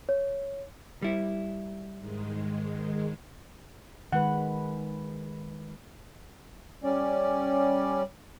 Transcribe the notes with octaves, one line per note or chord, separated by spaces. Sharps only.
C#5
G3 E4
G#2 D#3 G#3
D#3 G#3 B4 F#5
G3 C#4 D5